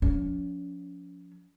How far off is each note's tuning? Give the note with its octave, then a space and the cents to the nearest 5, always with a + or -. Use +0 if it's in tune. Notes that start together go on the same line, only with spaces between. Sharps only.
F3 +25 C#4 +40